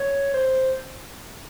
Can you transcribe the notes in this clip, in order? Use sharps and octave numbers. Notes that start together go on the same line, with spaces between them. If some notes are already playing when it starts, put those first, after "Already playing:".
Already playing: C#5
C5